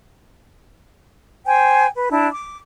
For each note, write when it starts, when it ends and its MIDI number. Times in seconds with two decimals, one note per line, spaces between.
1.46 1.86 72
1.46 1.86 79
1.46 1.86 80
1.95 2.07 71
2.10 2.27 62
2.10 2.27 64
2.33 2.56 86